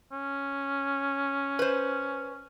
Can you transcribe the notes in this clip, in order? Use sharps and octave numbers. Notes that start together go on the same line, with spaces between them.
C#4
B4 C5